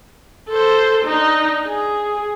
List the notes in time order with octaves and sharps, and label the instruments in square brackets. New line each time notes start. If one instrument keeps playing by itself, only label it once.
[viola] A4 C5
D4 D#4
G#4